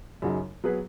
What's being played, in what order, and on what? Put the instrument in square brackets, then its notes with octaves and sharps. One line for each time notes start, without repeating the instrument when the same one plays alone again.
[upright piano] F#2 C#3 F#3 D#4
F#3 B3 G#4 B4